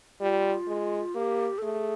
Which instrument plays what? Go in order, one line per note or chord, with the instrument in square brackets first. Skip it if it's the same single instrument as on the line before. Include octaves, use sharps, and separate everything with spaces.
[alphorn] G3 [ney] F4
[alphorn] G#3
[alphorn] A#3 [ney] G4
[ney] A4
[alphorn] A3 [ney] G#4